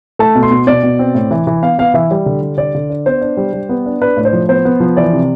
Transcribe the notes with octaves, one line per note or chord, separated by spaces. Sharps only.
A3 A5
B2
C6
B2
B2 D5
B2
C4
A2
E3
E3
B3 F5
B3 F5
E3 E5
G3
D3
G3
D3 D5
D3
D4
B3 C5
D4
G3
G3
B3
D4
D4 B4
A2
C5
F3
B3 C5
B3
F3
E3 D5
C3